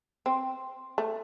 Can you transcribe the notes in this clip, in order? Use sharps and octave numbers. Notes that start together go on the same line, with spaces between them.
C4
A3